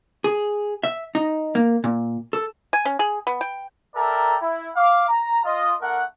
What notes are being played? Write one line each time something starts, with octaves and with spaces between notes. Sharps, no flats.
G#4
E5
D#4
A#3
A#2
A4
G#5
C#4
G#4
B3
G5
A4 A#4 D5 E5 G5 A#5
E4
F5 D6
A#5
F4 D#5
A3 D4 A#4 F#5